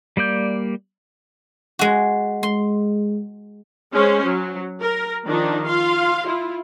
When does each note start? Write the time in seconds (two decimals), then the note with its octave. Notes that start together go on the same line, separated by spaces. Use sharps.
0.17 G3 A#3 D5 G6
1.79 G#3 F#4
2.43 G#3 C6
3.92 G#3 C#4 C5
4.25 F#3
4.80 A#4
5.25 D#3 F3 D4 D#4 F4
5.65 F4 F5 C6
6.26 E4 F4